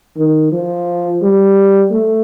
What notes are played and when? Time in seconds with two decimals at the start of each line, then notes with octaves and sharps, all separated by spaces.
0.17 D#3
0.52 F3
1.22 G3
1.91 A3